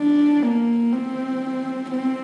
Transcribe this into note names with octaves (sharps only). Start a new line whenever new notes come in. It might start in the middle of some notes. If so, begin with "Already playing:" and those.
Already playing: D4
A#3
C4
C4